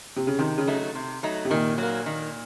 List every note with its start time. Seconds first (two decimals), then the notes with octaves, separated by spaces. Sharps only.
0.16 C3
0.27 C#3
0.39 C3 D#3
0.58 C#3
0.67 F#3 A3 D#4
0.95 C3
1.23 F#3 A3 D#4
1.45 C3
1.50 A#2 D#3
1.78 F#3 A#3
2.06 D#3